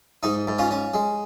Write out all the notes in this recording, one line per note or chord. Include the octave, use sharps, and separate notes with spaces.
G#2 D#4
G#2
C#4 F4
C#4
G#3